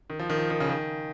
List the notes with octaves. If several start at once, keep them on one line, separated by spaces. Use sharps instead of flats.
D#3
F3
D#3
F3
D#3
C#3
D#3